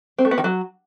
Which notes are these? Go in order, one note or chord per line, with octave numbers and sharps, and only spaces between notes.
C4
A3
B3
D#3
F#3